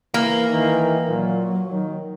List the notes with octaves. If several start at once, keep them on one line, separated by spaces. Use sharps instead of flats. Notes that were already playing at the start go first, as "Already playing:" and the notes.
E3 A#3
D#3 E3
A#2 F#3
D#3